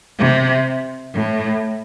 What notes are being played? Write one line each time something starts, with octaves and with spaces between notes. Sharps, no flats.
C3
A2